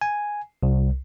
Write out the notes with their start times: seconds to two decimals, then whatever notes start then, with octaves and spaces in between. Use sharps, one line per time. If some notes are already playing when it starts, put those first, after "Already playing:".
0.01 G#5
0.63 C2